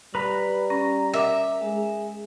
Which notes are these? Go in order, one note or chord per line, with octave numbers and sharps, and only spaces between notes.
G3 B4 A#5 B5
C#4 A#5
A#4 E5 D6
G#3 G#4